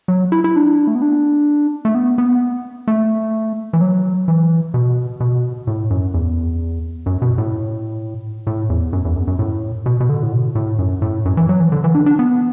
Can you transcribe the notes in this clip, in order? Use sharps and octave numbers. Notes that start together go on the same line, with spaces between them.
F#3
E4
E4
D4
A3
B3
D4
A3
B3
B3
A3
E3
F#3
E3
B2
B2
A2
F#2
E2
F#2
B2
A2
A2
E2
F#2
E2
F#2
F#2
A2
B2
B2
D3
A2
B2
A2
F#2
A2
F#2
E3
F#3
E3
D3
E3
D4
D4
B3